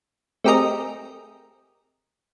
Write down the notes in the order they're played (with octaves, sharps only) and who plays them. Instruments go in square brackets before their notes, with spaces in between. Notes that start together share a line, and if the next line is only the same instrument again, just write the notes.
[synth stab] A3 C4 G4 G#4 A#4 D#5